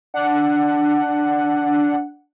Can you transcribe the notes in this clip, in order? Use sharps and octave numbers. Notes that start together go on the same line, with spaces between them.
D4 F#5